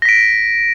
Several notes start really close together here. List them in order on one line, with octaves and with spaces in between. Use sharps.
A#6 B6 D7